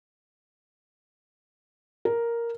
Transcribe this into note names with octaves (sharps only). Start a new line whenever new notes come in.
A#4